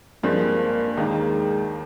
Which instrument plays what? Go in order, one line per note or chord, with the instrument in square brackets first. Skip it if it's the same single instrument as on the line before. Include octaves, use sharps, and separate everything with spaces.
[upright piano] G2 F3 G#3 C4 [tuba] A#3
[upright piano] D#2 D#3 A#3 D#4 [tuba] G#3